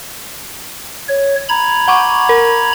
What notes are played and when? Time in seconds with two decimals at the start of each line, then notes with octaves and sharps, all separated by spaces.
1.09 C#5
1.49 A#5 B5 G#6
1.88 F#5 C#6 D6
2.29 A#4